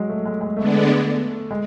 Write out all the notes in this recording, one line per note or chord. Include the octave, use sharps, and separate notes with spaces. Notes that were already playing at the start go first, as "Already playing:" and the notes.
Already playing: F#3 G#3
A3
G#3
G#3
D3 G#3 A3 B3 D4
G#3